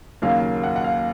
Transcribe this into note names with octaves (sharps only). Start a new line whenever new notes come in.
D#2 C#3 F#3 A#3 F5
F#5
F#5
F5